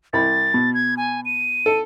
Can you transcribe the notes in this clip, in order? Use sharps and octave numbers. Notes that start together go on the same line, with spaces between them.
C2 B5 A6
B2
G#6
G#5
D#7
A4